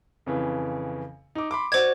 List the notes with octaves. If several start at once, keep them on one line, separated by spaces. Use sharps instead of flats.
F2 C#3 E3
D#4 D6
B5 C6 D6
F#4 C5 D5 G#6